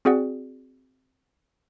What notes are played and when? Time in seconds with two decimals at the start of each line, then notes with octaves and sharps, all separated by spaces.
0.05 C4 F#4 G#4 D5 F#5